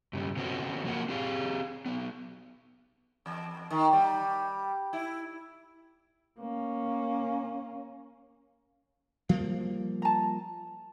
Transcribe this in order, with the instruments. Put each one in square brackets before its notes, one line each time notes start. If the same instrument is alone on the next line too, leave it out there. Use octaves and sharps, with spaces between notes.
[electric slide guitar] G2 C#3 G3
C#3 B3 C4 F#4 A4
F3 F#3 A#3 A#4 F#5
C4 G4 G#4 F5
F#3 B3
[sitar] E2
D#3
G3
E4
[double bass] A#3 C#4
[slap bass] F3 G3 A#3 [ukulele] F5
[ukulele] A5 A#5